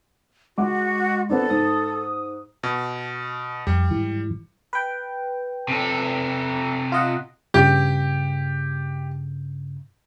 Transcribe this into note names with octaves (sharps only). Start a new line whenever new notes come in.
G#3 F#4 F#5 D6
B3 C4 D4 A4
G#2 D#6
B2
F2 G3
G#2 E3
B4 G5
C3 A4
F4 D#5 F#5
G2 C#3 G4